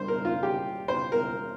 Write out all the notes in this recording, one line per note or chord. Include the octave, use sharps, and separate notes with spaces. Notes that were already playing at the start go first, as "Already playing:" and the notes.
Already playing: G2 G3 A#3 C5
A#4
F4
G4
C5
A#4